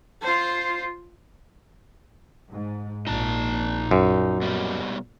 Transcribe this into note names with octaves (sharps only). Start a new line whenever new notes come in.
F4 C5
G#2
A#1 A#2 D#4 A5
F#2
B2 G3